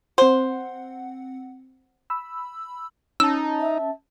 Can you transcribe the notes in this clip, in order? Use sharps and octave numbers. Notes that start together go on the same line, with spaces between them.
C4 C5 F#5
B5 E6
C#4 D#4 A5 E6
E5